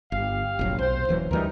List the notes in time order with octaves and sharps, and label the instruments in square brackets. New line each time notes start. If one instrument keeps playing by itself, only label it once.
[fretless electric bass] G1 [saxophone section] G4 F5
[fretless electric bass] F1 A#1 F#3
[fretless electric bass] B1 [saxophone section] C5
[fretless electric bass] D#1 E3 F#3
[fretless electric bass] D2 E3 G3 [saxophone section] D#4 A#4